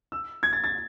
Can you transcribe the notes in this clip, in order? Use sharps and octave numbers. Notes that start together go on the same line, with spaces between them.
E6
G#6
A6
A6